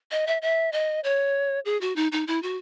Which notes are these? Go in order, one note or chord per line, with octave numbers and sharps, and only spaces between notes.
D#5
E5
E5
D#5
C#5
G#4
F#4
D#4
D#4
E4
F#4